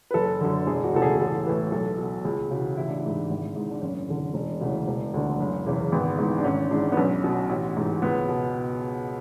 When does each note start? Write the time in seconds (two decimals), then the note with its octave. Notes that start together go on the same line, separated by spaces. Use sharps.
0.11 B4
0.14 F#1 A4
0.40 F#2 D3
0.67 E1 G#4
0.84 F#4
0.93 D2 C#3 E3 A4
1.02 G#4
1.19 A1 A4
1.46 A2 E3 B4
1.72 B1 A4
1.98 B2
2.25 C#2 G#4
2.51 C#3 E3 F#4
2.77 A1 E4
2.88 D4
2.98 E4
3.04 G#2 E3
3.29 G#1
3.56 G#2 E3
3.71 D4
3.82 F#1 C#4
4.08 E2 D3
4.34 E1
4.61 D2 C#3 E3
4.87 E1
5.14 D2 D3
5.40 F#1
5.66 E2 C#3 E3
5.92 G#1 B3
6.18 G#2 E3
6.38 D4
6.44 G#1 C#4
6.71 G#2 E3 D4
6.92 B3
6.97 B1 C#4
7.24 B2
7.49 A1
7.76 G#2 E3
8.02 C#2 B3
8.29 B2